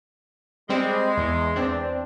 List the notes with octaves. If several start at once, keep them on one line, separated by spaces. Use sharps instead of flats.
G3 G#3 C4
E2
E2 C4 D4